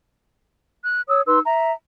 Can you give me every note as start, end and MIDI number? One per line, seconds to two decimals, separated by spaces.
0.85 1.01 90
1.08 1.21 73
1.08 1.21 87
1.08 1.21 88
1.26 1.39 63
1.26 1.39 71
1.26 1.39 84
1.26 1.39 88
1.45 1.72 76
1.45 1.72 82